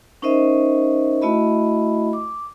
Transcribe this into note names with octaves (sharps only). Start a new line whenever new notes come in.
C#4 D#4 A#4 C5 D#5 E5
A3 E4 F#4 D#5 E5 B5
D6